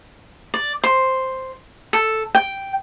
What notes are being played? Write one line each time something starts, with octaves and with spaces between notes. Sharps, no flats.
D5
C5
A4
G5